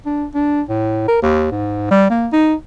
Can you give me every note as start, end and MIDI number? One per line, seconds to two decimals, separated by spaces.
0.06 0.26 62
0.34 0.62 62
0.69 1.06 45
1.08 1.18 70
1.22 1.51 39
1.51 1.89 44
1.91 2.10 55
2.10 2.28 58
2.33 2.54 63